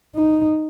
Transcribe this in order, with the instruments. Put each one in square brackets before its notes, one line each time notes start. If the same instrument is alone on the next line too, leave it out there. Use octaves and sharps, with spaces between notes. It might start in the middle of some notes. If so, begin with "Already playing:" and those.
[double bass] D#4